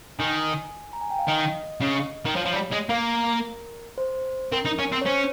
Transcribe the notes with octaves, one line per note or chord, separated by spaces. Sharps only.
D#3 G#5
A#5
G#5
G5
F5
D#3 D#5
C#3
D#3
F3 C#5
F3
G3
G#3
A#3 A#4
C5
C4 A#4
D#4
C#4
C4
C#5
C#4 C5